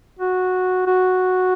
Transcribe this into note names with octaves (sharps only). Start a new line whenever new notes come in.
F#4
F#4